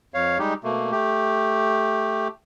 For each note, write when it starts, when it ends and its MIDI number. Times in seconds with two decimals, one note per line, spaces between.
0.14 0.38 41
0.14 0.38 73
0.14 0.38 77
0.39 0.54 55
0.39 0.54 56
0.39 0.54 63
0.39 0.54 67
0.64 0.91 47
0.64 0.91 57
0.64 0.91 58
0.91 2.28 57
0.91 2.28 67